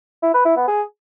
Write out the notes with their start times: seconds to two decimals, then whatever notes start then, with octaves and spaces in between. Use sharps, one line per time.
0.22 E4
0.34 B4
0.45 E4
0.56 B3
0.68 G#4